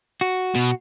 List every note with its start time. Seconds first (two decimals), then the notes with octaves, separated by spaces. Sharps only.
0.21 F#4
0.55 B2